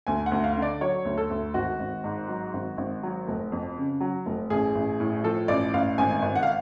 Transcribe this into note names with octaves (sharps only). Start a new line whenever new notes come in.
D2 G#5
F#5
D2
F5
D3
D5
F#3 C#5
D2
A4
D2
G#1 F#4
G#1
G#2
F#3
G#1
G#1
F#3
F1
F2
C#3
F#3
F1
A1 G#4
A1
A2
F3 A4
A1 D5
A1 F5
G#1 G#5
G#1
F#5
F5